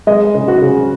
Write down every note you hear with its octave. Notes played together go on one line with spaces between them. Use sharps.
G#3 D#5
C#3
F#4
C#3